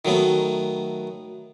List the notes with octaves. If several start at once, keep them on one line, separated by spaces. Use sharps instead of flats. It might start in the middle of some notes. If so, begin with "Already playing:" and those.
D#3 F#3 A3 B3